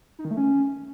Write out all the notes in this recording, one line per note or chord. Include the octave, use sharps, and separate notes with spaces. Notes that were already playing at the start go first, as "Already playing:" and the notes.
D#4
D#3
A3
C#4